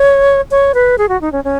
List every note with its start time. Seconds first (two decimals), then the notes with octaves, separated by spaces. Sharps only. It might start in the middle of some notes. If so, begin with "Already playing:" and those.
Already playing: C#5
0.51 C#5
0.74 B4
0.98 G#4
1.09 F#4
1.21 D#4
1.32 C#4
1.44 C#4